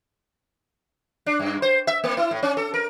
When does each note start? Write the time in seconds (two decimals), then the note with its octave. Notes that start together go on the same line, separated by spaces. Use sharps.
1.26 D4
1.39 G2
1.62 C5
1.87 E5
2.04 A#3
2.17 E4
2.31 A2
2.43 C#4
2.57 A4
2.74 A#4